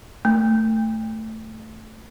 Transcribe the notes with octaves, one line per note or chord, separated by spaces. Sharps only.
A3